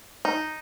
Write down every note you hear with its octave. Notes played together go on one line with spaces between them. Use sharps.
D#4